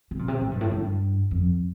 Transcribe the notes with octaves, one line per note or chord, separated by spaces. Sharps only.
C3
A#2
C3
A2
G2
A2
G2
F2